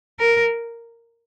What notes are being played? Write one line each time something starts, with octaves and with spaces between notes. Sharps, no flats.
A#4